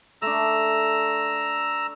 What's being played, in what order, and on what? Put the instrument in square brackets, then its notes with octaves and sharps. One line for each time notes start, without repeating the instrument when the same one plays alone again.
[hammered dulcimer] A3 D4 [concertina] A#5 E6